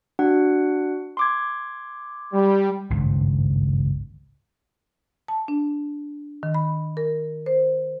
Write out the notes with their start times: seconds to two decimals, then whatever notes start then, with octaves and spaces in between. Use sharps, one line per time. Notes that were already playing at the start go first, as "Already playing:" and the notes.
0.19 D4 F#4 F#5
1.17 C6 D6 G#6
2.33 G3
2.90 G#1 C#2 G2
5.28 A5
5.48 D4
6.43 D#3
6.54 B5
6.97 A#4
7.46 C5